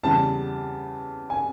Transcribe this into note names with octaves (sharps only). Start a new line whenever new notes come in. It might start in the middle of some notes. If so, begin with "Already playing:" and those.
E2 C#3 E3 G3 A5
G#5